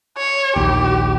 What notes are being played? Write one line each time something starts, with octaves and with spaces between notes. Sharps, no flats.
C#5
A#1 D#2 G4